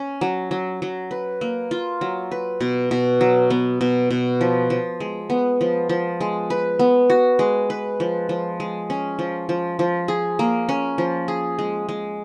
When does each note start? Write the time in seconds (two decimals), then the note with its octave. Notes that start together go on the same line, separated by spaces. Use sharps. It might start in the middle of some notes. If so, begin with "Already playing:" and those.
Already playing: C#4
0.21 F#3
0.51 F#3
0.82 F#3
1.11 B4
1.41 A#3
1.71 F4
2.01 F#3
2.31 B4
2.61 B2
2.91 B2
3.21 F#3
3.50 B3
3.81 B2
4.11 B2
4.41 F3
4.70 F3
5.00 G#3
5.30 B3
5.61 F3
5.89 F3
6.21 G#3
6.50 B4
6.79 B3
7.10 F#4
7.39 G#3
7.70 B4
8.00 F3
8.29 F3
8.60 G#3
8.90 C#4
9.19 F3
9.49 F3
9.79 F3
10.08 G#4
10.39 A#3
10.69 C#4
10.98 F3
11.28 G#4
11.59 G#3
11.89 G#3